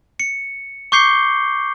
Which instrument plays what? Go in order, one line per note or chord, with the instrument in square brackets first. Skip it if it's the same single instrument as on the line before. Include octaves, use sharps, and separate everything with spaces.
[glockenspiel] C#7
C#6 D6 G6 C7 C#7 G7